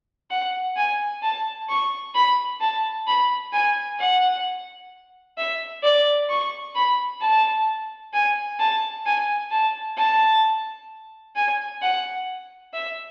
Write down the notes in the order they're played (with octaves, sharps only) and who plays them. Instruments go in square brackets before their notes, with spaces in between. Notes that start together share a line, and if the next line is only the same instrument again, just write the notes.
[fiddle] F#5
G#5
A5
C#6
B5
A5
B5
G#5
F#5
E5
D5
C#6
B5
A5
G#5
A5
G#5
A5
A5
G#5
F#5
E5